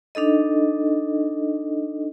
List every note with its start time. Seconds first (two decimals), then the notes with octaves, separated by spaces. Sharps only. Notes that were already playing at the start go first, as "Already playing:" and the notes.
0.15 D4 D#4 A4 D#5